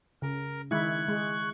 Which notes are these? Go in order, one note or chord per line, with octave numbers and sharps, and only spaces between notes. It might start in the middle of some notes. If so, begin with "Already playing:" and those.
C#3 A#4
D#3 G#3 E4 C#6 F#6 G#6
G#3